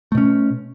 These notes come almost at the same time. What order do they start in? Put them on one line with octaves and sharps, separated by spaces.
A3 B2 C#4